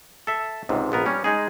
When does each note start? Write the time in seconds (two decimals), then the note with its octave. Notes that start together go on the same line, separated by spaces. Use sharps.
0.27 A4 E5
0.69 C#2 G#2 C3
0.92 A#1 B3 A#4
1.06 G3 C#4
1.24 G#3 D#4 G#4